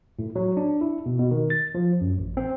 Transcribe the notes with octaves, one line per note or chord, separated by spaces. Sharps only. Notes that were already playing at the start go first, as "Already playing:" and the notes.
A2
F#3
D4
E4
B2
B2
D#3
A6
F3
F#2
A1
C4